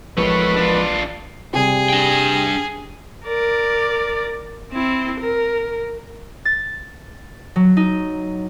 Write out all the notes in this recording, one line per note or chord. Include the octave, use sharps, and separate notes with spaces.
A1 B2 D#3 F3 G#3 A3 B4 C#5
D4 F4
C3 G3 G#4
D4 G5
A#4 D5
C4 E4
A#4
A6
F#3
D#4